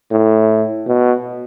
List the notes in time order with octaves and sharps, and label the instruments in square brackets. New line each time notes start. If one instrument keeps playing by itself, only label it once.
[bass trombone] A2
B2